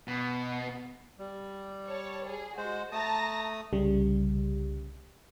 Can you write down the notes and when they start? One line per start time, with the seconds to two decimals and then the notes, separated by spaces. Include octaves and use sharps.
0.08 B2
1.19 G3
1.87 C#5 A5
2.27 G#4
2.57 G#3 F#4 C5
2.92 A3 A5 A#5 D#6 A#6
3.73 C2 C#3 G3